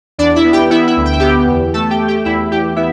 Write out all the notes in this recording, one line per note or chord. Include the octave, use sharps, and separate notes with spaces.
E2 D4 D5
E4 E5
B3
G4 G5
B3 E4 E5
E4 E5
D2
G5
E5
B3 G4 G5
E2
A3 A4 A5
G4 G5
A3
G4 G5
E2 E4 E5
E2 G4 G5
B3 E4 E5